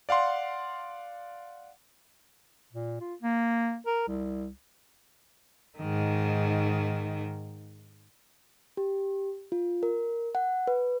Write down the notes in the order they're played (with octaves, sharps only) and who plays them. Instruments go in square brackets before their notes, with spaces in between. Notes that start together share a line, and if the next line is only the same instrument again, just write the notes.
[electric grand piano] D5 F5 F#5 C6
[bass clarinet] A#2
F4
A#3
A#4
C2
[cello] G#2 D#3
[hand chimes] G4
F4
A#4
F#5
B4